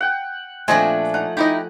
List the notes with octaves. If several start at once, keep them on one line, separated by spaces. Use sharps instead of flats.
F#5 G5
A#2 F3 A3 C4 D4 D#5 G#5
D#4 F#5
D#4 E4 G4 D#5